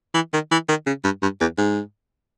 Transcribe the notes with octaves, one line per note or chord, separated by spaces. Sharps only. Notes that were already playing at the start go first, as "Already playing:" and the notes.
E3
D#3
E3
D#3
C#3
G2
G2
E2
G#2